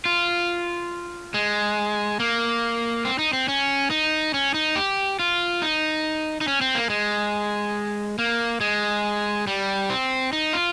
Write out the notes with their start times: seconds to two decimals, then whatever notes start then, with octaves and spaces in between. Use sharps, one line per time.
0.05 F4
1.34 G#3
2.20 A#3
3.05 C4
3.19 D#4
3.33 C4
3.48 C#4
3.90 D#4
4.34 C#4
4.54 D#4
4.76 G4
5.19 F4
5.62 D#4
6.41 D#4
6.48 C#4
6.61 C4
6.75 A#3
6.90 G#3
8.19 A#3
8.61 G#3
9.47 G3
9.90 C4
10.33 D#4
10.53 F4